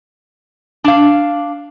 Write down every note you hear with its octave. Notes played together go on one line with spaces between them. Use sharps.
D4 F5